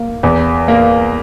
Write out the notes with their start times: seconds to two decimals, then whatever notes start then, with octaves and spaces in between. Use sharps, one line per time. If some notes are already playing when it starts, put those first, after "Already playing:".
Already playing: A#3
0.23 E2
0.68 A#3